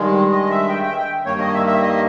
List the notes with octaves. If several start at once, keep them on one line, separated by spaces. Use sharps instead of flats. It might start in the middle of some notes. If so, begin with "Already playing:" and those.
Already playing: G2 D#3 G#3
D#5
E5
G5
G5
E5
G5
G2 D#3 A#3 C#5
D#5
E5
E5
D#5